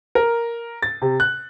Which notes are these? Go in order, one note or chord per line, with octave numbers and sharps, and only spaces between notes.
A#4
A6
C3
F#6